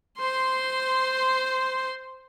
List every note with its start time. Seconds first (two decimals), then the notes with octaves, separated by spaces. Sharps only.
0.19 C5 C6